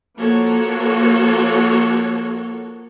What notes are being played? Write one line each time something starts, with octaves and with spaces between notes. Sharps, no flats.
F3 A#3 F#4 A4 C#5